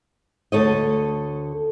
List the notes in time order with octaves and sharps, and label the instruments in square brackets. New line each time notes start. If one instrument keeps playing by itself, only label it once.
[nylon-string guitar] D2 A4 C#5 D#5